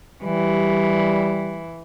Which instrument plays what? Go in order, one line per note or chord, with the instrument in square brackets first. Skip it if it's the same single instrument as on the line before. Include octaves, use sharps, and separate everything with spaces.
[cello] E3 [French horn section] G3